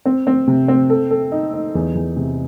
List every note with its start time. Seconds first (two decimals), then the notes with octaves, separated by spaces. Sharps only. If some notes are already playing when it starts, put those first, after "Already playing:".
0.05 C4
0.27 C4
0.47 C3
0.68 C4
0.90 A4
1.11 A4
1.32 D#4
1.53 D#4
1.75 E2
1.95 E2
2.16 C3